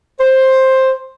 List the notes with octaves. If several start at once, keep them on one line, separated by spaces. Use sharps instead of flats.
C5